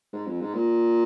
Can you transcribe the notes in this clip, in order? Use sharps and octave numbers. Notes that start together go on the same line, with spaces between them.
G#2
F2
G#2
A#2